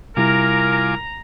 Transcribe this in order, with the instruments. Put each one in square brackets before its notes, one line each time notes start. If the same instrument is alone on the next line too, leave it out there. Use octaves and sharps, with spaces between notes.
[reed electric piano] C3 G3 E4 [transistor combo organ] F4 G#5 D6 [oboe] A#4 [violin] A#5